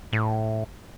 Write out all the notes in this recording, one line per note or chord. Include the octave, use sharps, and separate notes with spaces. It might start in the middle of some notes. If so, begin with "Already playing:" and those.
A2